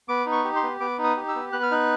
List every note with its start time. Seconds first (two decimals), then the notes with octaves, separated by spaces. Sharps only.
0.09 B3 D6
0.26 D#4
0.32 C#6
0.44 G4
0.56 C6
0.63 B3
0.80 B3 D6
0.98 D#4
1.04 D#6
1.17 G4
1.28 E6
1.35 B3
1.52 B3 F#6
1.63 F6
1.71 D#4 F#6